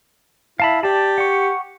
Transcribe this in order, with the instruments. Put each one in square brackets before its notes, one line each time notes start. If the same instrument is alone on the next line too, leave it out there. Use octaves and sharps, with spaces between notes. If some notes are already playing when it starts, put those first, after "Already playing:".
[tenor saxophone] E4 [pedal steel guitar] F5 A5 B5
[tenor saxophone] G4 [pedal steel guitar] D5 A5
[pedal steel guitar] F#5 C#6